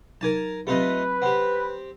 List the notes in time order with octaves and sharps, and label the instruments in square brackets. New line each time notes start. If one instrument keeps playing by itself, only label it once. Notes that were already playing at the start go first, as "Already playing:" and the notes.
[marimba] F#3 D#4 G#6 [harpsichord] A#4 G#5 A5
[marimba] F#3 C4 G4 [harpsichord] A3 F4 D#5 [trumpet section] B4
[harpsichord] C4 G4 [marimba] F#5